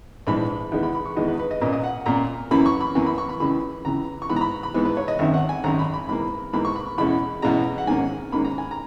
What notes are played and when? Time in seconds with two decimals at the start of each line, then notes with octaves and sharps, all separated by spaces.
0.27 A#1 G#2 E3 B5
0.72 E2 D#3 G#3 B3
0.83 B5
0.95 B5
1.05 C#6
1.17 E2 D#3 G#3 B3 D#5
1.28 B4
1.39 B4
1.51 D#5
1.61 A#2 A#3 C#4 D#5
1.73 D#5
1.84 F#5
2.06 A#2 A#3 C#4 A#5
2.51 F#2 E3 A#3 C#4 B5
2.66 C#6
2.80 B5
2.95 F#2 E3 A#3 C#4 G#5
3.07 B5
3.18 C#6
3.29 B5
3.40 C#2 C#3 E3 B5
3.85 C#2 C#3 E3 A#5
4.22 C#6
4.29 G#2 E3 B3 B5
4.36 A#5
4.41 B5
4.63 B5
4.74 G#2 E3 B3
4.85 B4
4.97 C#5
5.08 D#5
5.19 G#1 F#2 D#3 E5
5.34 F#5
5.49 G#5
5.64 G#1 F#2 D#3 A#5
5.79 B5
5.94 B5
6.08 G#2 E3 A#3 B5
6.53 G#2 E3 A#3 B5
6.65 C#6
6.76 B5
6.98 E2 B2 G#3 C#4 B5
7.42 E2 B2 G#3 C#4 A#5
7.78 F#5
7.87 G#2 D#3 A#3 C#4 G#5
8.32 G#2 D#3 A#3 C#4 B5
8.45 A#5
8.58 G#5
8.71 A#5